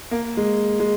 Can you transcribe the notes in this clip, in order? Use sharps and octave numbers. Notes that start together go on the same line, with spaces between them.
A#3
G#3
G#3